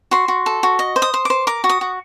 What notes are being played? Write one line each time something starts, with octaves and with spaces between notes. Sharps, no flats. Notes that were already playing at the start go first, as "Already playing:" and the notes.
F#4 C6
F#4
A4
F#4
D#5
C5
D#6
C5
C5 D6
A#4 D6
F#4
D#6
F#4